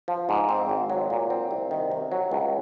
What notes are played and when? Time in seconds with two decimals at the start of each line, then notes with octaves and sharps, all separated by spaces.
0.08 F3
0.29 G#2
0.49 C4
0.69 G#1
0.90 F#3
1.10 A#2
1.30 C4
1.51 C2
1.71 D#3
1.91 C3
2.12 F#3
2.31 C#2